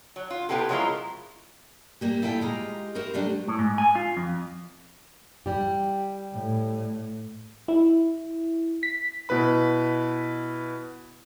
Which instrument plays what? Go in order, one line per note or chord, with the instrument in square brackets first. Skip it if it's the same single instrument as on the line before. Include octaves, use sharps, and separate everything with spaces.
[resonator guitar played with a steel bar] F#3
F4
C3 B3 E4 G4 A4
F3 F#3 G#3 E4 F4 A#4
[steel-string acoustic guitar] G3 A#3 G4
A#2 E4 F4 A4 G5
G#3 F4 G4 A#5
E4 F#4 G4 A#4 C5
C3 F#3 G3 A3 D4 G4
[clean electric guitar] A2
G#2
G#5
F4
F2
[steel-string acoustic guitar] G3 G4
[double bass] A2
[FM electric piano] E4
B6
[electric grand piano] B2 E4 B4 B5